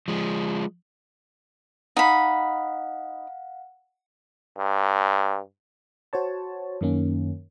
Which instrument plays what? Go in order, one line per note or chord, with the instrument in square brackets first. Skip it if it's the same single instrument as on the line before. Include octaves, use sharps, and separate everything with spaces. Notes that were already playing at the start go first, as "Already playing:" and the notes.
[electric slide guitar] F3 G#3
[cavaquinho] D#4 B5 [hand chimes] F5 F#5
[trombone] G2
[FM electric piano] F#4 C5 C#5 A5
F#2 D#3 A#3 C#4